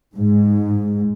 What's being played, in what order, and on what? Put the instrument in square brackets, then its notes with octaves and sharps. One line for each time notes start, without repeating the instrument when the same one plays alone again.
[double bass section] G#2